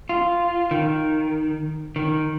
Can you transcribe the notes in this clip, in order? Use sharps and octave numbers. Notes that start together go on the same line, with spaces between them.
F4
D#3
D#3